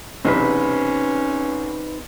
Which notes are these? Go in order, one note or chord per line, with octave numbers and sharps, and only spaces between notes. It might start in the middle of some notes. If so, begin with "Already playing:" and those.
B1 E2 C3 C4 C#4 D#4 B4